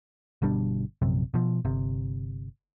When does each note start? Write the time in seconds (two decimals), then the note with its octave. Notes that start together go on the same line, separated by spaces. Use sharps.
0.42 G1 B2 G3 D4
1.02 A#1 F#2 C3
1.34 B2 F3
1.65 G1 C3